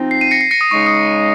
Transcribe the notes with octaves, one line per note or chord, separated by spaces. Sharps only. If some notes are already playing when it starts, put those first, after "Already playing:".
Already playing: F3 C4 D#4
C7
C7 D#7
A#6 C#7
C7
A#6 C#7
D#6
C#3 G#3 D#4 C#6
D#6